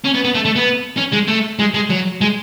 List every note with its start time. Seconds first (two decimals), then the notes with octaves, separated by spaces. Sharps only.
0.04 C#4
0.14 B3
0.24 B3
0.35 A3
0.45 A3
0.56 B3
0.97 C#4
1.12 G#3
1.28 A3
1.59 G#3
1.74 G#3
1.90 F#3
2.21 G#3